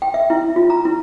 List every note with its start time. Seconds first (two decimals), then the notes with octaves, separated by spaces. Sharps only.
0.02 G5
0.14 E5
0.30 E4
0.56 F4
0.70 A#5
0.85 E4